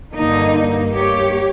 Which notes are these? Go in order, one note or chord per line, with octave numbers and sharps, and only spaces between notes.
G2 D3 A#3 D#4
G4 C#5